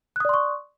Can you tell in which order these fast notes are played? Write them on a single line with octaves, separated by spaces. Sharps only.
F#6 D#6 D5 C6 C#6